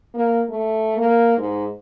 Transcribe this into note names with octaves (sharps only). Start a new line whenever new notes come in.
A#3
A3
A#3
G#2